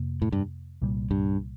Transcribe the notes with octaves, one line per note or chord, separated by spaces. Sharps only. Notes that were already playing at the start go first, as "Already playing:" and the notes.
Already playing: F2 C3 A#3
A2
G2
C2 A#2 G3
G2